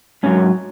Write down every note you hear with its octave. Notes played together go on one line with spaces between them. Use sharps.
G#2 F#3 C#4